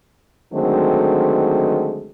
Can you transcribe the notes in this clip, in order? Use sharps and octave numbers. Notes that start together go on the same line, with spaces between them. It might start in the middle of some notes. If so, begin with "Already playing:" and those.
D3 D#3 F#3 G#3 A3 C4